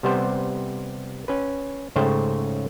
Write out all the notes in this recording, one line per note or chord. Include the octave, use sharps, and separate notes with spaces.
C3 G3 B3 C5
C#4 B4
G#2 C#3 A3 C5 C#5 G5